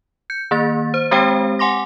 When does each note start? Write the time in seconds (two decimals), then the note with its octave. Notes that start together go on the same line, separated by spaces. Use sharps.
0.30 G6 C#7
0.51 D#3 A#3 A6
0.94 C5
1.11 G#3 C4 G4 C5 G5
1.59 F#5 G#5 C6 D6 A#6